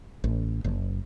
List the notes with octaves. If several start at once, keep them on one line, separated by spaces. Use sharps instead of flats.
A1
F#1